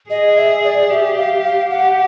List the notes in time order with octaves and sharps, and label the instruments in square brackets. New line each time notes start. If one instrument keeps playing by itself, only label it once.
[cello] G#4 [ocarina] D#5
[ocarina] E5
D5
[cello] G4 [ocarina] E5
[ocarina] F5
F5
[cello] G4 [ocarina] F#5